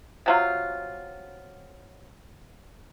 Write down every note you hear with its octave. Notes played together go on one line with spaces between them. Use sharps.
C3 F#3 F4